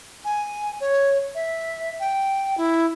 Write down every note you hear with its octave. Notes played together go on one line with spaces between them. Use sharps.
G#5
C#5
E5
G5
E4